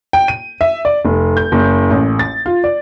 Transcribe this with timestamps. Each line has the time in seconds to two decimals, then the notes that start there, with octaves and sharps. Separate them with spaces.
0.13 G5
0.28 D#7
0.61 E5
0.85 D5
1.05 F1
1.37 G6
1.52 F#1
1.91 A1
2.19 A6
2.46 F4
2.64 D5